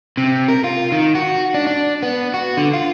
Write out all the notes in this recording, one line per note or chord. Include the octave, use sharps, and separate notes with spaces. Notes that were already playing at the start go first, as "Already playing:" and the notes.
C3
A#4
F4
D#3
F#4
D4
D4
B3
F#4
D3
F4